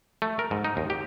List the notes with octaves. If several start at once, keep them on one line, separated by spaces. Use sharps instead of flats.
A3
A#4
G#2
D#4
D#2
G4